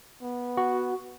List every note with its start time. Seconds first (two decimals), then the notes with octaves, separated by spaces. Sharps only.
0.22 B3
0.57 F#4